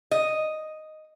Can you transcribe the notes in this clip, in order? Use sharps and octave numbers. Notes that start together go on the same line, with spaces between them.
D#5